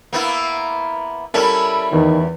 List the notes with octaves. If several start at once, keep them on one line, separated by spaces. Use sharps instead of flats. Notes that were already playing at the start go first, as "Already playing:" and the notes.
A#3 B3 E4
G3 C#4 E4 A4 A#4
E2 D#3